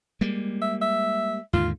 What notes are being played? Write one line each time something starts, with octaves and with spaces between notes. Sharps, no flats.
G3 G#3 A#3
E5
E5
D#2 G#2 D3 F4